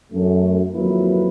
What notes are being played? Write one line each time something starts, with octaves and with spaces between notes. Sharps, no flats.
F#2 A3
G#1 F2 F#3 A#3 E4 B4